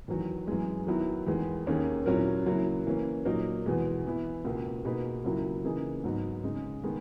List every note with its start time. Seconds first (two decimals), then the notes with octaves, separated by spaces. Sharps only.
0.08 E2 D#3 F#3
0.47 F#2 E3 G#3
0.87 D#3 F#3 B3 E4
1.27 E2 D#3 G#3
1.66 D#2 D#3 A#3 C#4 G#4
2.06 A#2 F#3 C#4 E4 A#4
2.46 C#3 F#3 A#3 E4
2.86 E3 A#3 C#4
3.25 A#2 F#3 A#3 D#4 A#4
3.66 E2 B2 G#3
4.05 E3 B3 E4
4.45 C#2 B2 A#3
4.85 B2 A#3 D#4 G#4 B4
5.24 C#2 C#3 F#3 A#3 E4
5.64 C#3 E3 A#3 D#4 G#4
6.04 G#2 F#3 B3 D#4
6.43 C#3 G#3 D#4
6.83 D#3 G#3 B3